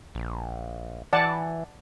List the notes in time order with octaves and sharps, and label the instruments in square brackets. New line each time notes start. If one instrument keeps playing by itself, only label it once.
[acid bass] A#1
[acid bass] E3 [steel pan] D5 F#5 A5